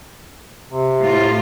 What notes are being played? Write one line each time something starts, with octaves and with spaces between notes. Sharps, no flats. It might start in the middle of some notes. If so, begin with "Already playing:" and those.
C3
A2 F4